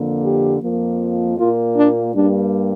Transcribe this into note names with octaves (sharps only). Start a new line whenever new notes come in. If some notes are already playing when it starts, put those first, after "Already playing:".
Already playing: F2 D3 A#3
G4
F2 F3 A#3
A#2 A#3 F4
D4
G2 G3 A#3 D4